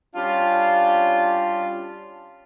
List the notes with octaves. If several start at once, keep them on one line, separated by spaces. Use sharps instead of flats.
G3 C#4 D4 F4